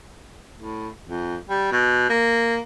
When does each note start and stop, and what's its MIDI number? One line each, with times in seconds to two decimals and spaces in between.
0.59 0.89 45
1.08 1.36 41
1.49 1.72 55
1.72 2.07 47
2.09 2.57 58